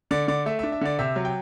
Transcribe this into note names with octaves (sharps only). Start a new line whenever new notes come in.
D3 D5
D3 D5
A3 E5
E5
D4
E5
D3 D5
C3 E5
F#3
G5